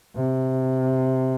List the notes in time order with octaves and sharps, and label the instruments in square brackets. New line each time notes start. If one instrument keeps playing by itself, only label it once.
[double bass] C3